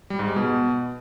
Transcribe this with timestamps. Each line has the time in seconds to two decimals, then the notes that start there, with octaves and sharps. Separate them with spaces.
0.10 G3
0.19 G#2
0.28 G#3
0.36 B2